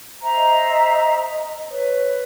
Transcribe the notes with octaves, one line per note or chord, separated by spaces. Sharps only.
C5 E5 A#5
D#5
B4 C#5